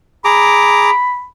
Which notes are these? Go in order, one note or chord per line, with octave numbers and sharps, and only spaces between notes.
G#4 A#5 B5 D6